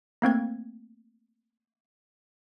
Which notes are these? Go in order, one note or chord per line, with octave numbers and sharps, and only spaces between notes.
A3 A#3 C4 G#6